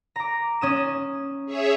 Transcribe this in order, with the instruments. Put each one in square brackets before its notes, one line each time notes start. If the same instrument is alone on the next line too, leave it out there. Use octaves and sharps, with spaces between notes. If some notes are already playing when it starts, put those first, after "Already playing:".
[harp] A#5 D6
C#4 D#6 E7
[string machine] G#4 C#5 E5